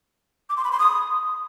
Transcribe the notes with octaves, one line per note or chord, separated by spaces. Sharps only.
D6
C6
B5
C6
D#6